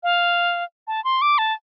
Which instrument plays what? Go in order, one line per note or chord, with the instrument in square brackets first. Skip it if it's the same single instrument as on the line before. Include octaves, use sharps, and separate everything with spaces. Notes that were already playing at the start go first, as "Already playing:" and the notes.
[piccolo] F5
A5
C6
D6
A5